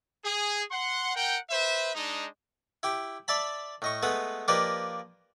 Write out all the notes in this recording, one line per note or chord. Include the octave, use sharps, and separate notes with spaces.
G#4
F#5 C6
A#4 F#5 G5
B4 C5 E5
G#3 D4 D#4
E4 G4 G5
D5 E5 A5 B5
A2 D#5 C#6
G#3 A3 B3 B4 D#6
F3 A#3 G4 B4 D5 D#5